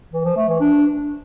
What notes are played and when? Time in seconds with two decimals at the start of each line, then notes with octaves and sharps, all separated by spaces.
0.13 E3
0.25 F3
0.37 A3
0.48 E3
0.60 D4